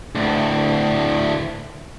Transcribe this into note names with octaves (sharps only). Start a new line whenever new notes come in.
D2 A2